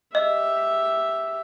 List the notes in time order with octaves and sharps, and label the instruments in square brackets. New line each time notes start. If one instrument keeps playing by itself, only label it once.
[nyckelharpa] G4 E5 [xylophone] D#5